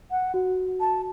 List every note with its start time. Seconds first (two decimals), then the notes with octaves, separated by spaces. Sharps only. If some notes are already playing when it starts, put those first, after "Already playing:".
0.11 F#5
0.34 F#4
0.80 A5